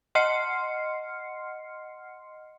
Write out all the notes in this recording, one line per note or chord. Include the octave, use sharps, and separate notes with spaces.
D#5 F#5 C6 F6 C7 C#7